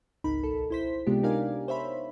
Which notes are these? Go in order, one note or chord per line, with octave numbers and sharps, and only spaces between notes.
G#1 C#2 D#4 A#4 B5
B1 A4
E4 C5 B6
C3 G#3 B3 D4 F4 G4
D#4 G4 A#4 D5 F5 G#5
C5 C#5 E5 B5